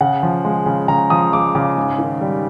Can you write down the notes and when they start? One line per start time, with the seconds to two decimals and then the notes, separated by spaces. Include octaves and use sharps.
0.01 C#3 F#5
0.23 F3
0.45 G#3
0.66 C#3
0.88 C#3 A#5
1.10 F3 D#6
1.33 G#3 D6
1.55 C#3 D6
1.77 G#2
1.98 D#3
2.21 G3